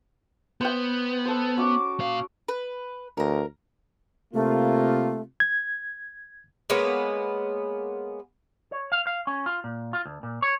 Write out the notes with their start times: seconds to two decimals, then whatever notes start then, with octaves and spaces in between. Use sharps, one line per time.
0.61 B3 C5 G5
1.25 A4 C5
1.57 C#4 F#4 D6
2.00 A#2 F5
2.48 B4
3.17 D2 A#4 A#5
4.34 C3 A3 A#3 F4
5.40 G#6
6.70 G#3 A#3 B3 C#5
8.72 C#5
8.92 F5
9.07 F5
9.27 C#4
9.46 F4
9.64 A#2
9.93 F4
10.06 D2
10.23 A#2
10.42 C#5